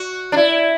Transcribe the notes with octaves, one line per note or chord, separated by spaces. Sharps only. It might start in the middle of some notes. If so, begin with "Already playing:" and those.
Already playing: F#4
D4
E4